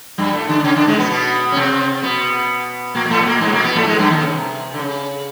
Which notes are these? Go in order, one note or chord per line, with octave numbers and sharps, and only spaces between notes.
G2 G3
A2 A3
D3 D4
D4
C#3 C#4
D3 D4
G#2 G#3
B2 B3
B2 B3
C#4
C3 C4
B2 B3
A#2 A#3
A#3
A2 A3
B3
A#2 A#3
G#2 G#3
A#2 A#3
B2 B3
A2 A3
G#2 G#3
G2 G3
D#2 D#3
C#3
C3
D3
C#3